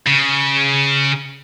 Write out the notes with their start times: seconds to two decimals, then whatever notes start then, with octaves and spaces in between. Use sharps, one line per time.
0.07 C#3